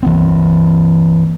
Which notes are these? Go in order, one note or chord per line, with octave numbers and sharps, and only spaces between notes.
E3 A#3 C4